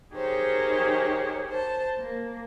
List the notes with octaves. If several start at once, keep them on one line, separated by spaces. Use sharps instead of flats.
D#4 G4 G#4 A#4 C5 C#5
C5 A5
A#3